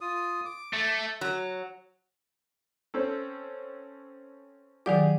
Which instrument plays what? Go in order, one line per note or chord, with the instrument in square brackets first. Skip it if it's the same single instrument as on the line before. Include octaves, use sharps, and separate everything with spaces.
[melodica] F4 D#6
D6
[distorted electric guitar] A3
[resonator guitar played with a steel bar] F#3
[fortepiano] C4 C#4 A4
[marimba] D#3 F#3 D5 [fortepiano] G4 G#4